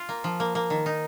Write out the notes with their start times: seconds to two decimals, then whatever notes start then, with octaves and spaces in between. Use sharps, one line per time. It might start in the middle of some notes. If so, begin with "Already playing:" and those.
Already playing: F4
0.09 A#3
0.24 F3
0.40 A#3
0.55 A#3
0.70 D#3
0.86 D#4